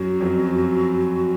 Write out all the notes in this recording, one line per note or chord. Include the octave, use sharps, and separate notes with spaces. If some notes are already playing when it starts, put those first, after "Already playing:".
Already playing: F#2 F#4
F2